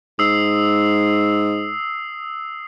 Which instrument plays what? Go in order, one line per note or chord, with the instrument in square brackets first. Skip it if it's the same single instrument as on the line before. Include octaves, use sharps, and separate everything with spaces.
[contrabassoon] G#2 [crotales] D#6 E6 C7